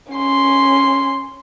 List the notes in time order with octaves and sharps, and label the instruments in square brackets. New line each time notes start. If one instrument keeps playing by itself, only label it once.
[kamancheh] C#4 C6